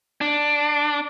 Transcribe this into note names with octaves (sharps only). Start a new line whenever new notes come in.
D4